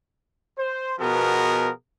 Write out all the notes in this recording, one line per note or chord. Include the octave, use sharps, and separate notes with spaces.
C5
B2 F3 B3 F#4 G#4 A#4